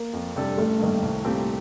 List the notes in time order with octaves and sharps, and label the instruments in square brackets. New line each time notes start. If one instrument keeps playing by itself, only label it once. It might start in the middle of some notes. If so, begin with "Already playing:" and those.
Already playing: [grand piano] A#3
[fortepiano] F2
C3 G3 D4 A4
[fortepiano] A1 [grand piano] A3
[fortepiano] G2 D#3 A#3
C2
A#2 A3 C4 G4